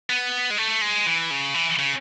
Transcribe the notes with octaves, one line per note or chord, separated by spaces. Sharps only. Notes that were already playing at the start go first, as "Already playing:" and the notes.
B3
G#3
A3
G#3
E3
C#3
E3
C#3